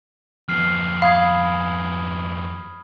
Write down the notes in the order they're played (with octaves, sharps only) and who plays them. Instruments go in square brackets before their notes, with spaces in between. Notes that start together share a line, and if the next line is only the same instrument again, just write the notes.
[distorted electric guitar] F2 B3 [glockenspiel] F6 C7
[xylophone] F5 [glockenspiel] B5 D#6 G#6